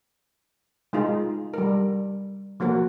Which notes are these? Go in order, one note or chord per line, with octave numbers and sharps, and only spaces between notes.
G#3 D#4 F4
G3 A#4
F3 A#3 F#4 A#4